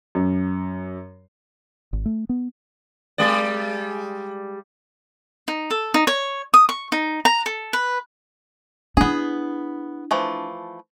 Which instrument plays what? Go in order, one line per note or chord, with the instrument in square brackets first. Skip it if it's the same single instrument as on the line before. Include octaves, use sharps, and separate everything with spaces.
[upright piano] F#2
[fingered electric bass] G#1
A3
B3
[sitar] G3 G#3 D5
[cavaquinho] D#4
A4
D#4
C#5
D#6
C#6
D#4
A#5
A4
B4
[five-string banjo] B3 G#4 [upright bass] D4 E4
[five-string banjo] E3 F3 A3